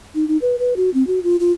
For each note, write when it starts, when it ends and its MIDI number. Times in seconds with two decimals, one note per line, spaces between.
0.15 0.27 63
0.28 0.37 63
0.42 0.56 71
0.59 0.74 71
0.76 0.90 66
0.94 1.06 60
1.07 1.19 66
1.23 1.36 65
1.40 1.52 65